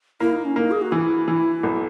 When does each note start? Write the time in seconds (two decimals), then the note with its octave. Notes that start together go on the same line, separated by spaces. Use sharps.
0.20 A#3 E4
0.33 D#4
0.45 C#4
0.56 A#3 D#4
0.71 G#4
0.82 F#4
0.92 E3 E4
1.28 E3
1.63 B1